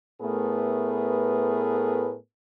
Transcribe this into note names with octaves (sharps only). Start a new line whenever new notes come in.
A2 A3 B3 G#4 A#4 B4